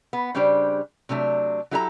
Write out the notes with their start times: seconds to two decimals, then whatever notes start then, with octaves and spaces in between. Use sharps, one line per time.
0.13 B3
0.35 C#3 G3 D4 G4 C5
1.09 C3 F#3 A3 D4
1.71 F#3 E4 G4 A4 C#5 A#5